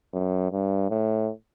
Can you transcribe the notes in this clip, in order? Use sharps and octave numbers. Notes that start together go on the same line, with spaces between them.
F#2
G2
A2